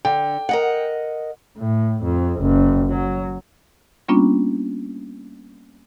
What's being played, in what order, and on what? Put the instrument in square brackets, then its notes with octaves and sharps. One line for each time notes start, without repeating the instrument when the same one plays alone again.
[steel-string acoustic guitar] D3 [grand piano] G5
[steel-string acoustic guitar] A#4 D#5 F#5
[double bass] A2
F2
F#1
F#3
[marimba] G3 A#3 B3 C#4 D4 F4